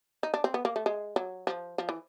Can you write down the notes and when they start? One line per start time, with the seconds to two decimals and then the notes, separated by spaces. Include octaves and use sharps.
0.23 D#4
0.34 D4
0.44 C4
0.54 B3
0.65 A#3
0.76 A3
0.86 G#3
1.16 F#3
1.47 F3
1.78 F3
1.89 E3